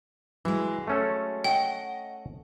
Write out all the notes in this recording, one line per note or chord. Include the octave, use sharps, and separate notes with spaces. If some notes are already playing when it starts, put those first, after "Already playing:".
E3 F#3 G#3
A3 C#4 A4
D#5 F#5 G5